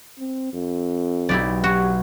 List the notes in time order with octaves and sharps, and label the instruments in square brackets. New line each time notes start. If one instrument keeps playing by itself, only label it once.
[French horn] C4
F2
[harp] B1 [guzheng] E4 G4 D5
[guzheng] F#4 [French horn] G4